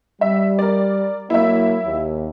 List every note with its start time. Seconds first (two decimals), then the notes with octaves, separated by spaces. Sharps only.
0.21 G3 E5
0.59 A#4 D5
1.30 F#3 A#3 E4 E5
1.85 D#2